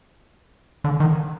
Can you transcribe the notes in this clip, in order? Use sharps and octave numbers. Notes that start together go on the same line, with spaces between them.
D3
D#3